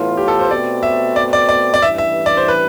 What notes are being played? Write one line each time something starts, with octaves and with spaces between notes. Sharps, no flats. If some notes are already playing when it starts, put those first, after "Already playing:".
Already playing: A2 E3 B3 F4
G4
A4
C5
B2 A3 C4 D5
E5
D5
D5
D5
D5
A1 G2 E3 E5
E5
D5
C5
B4